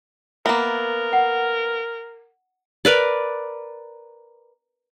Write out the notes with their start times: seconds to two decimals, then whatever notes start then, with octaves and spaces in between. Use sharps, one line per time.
0.46 A#3 B3 A#4 E5
1.13 F#5
2.85 A#4 B4 D5